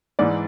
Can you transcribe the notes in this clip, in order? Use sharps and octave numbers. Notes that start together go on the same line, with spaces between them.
G#2 E3 D5